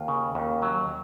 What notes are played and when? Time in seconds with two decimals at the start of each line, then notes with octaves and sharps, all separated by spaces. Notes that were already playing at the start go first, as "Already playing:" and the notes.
Already playing: D#2 F4
0.08 C#3
0.35 D#2
0.62 F#3